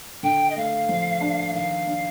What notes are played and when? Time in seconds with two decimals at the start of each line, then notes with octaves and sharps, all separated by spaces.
0.23 D3 G5
0.49 D#5
0.56 A3 F5
0.89 F3
1.21 D4
1.54 D#3 F5
1.87 D4